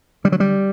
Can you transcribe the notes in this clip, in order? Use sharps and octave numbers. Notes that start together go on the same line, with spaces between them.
D3 G3
F#3
G3